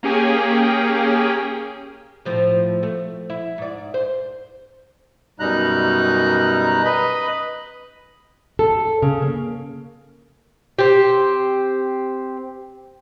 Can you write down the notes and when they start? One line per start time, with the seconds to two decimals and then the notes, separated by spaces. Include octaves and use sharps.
0.03 A#3 C#4 G4 G#4 G5
2.25 A2 F3 C4
2.83 A3
3.30 E4
3.58 G#2 D5
3.94 C5
5.40 F#2 B2 G3 D#4 A#5 F#6
6.85 B4 D#5 B5
8.59 A4
9.02 C#3
9.22 A#3
10.79 C4 G4